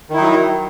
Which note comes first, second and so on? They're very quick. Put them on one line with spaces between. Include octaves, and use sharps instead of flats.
D#3 E4 D#4 F#3